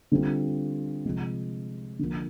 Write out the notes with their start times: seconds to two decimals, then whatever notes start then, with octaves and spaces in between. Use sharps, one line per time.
0.12 D3 G3 C4 F4
1.05 C3 F3 G#3
1.99 D3 F3 A#3